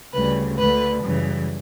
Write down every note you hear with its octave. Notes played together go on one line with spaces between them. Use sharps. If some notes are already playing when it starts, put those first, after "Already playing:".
D2 C#3 G3 B4
D2 D3 A3 B4
F#2 C#3 E3 G3